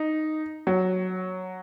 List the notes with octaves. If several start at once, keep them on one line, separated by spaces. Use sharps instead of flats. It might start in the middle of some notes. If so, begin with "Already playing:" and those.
Already playing: D#4
F#3